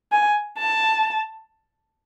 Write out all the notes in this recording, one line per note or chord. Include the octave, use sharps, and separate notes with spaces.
G#5
A5